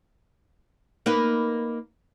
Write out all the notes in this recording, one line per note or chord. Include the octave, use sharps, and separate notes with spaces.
A#3 D#4 B4